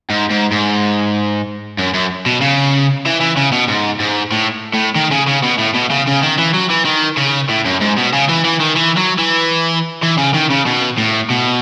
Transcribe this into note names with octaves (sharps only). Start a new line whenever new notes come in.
G#2
G#2
G#2
F#2
F#2
B2
C#3
E3
E3
C#3
B2
G#2
G#2
A2
A2
D#3
C#3
C#3
B2
A2
B2
C#3
C#3
D#3
E3
F#3
E3
D#3
C#3
A2
F#2
G#2
B2
C#3
E3
E3
D#3
E3
F#3
E3
E3
C#3
D#3
C#3
B2
A2
B2